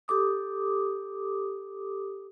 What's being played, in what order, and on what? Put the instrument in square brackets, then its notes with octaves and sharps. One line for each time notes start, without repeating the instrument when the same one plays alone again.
[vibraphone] G4 A4 D6 D#6